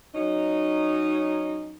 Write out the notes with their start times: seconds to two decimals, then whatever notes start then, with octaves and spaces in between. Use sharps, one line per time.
0.14 F#3 C#4 D#4